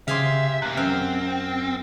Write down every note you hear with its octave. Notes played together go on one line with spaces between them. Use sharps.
C#3 G4 G#4 E5 F5 C6
C3 A#3 F#6
F#2 C4 F6